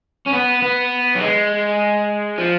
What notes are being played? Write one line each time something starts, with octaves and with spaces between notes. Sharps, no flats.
C#4
B3
B3
F#3
G#3
F3